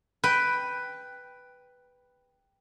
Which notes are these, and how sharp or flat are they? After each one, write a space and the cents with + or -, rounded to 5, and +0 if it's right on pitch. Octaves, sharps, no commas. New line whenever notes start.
B4 +5 G5 +0